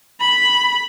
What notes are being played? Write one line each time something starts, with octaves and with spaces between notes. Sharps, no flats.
B5